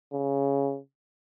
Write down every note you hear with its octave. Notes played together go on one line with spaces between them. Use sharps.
C#3